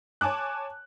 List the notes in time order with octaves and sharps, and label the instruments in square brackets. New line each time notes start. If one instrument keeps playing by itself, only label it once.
[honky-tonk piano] C#5 G#5 A5 D6 F#6